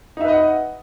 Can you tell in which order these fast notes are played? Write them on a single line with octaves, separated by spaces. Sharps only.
D#4 E5 B4 D#5 F#5